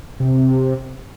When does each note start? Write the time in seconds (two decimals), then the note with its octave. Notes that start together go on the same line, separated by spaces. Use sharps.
0.20 C3